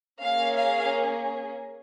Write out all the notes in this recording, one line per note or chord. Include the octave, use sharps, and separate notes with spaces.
A#3 C#4 G#4 F5
F5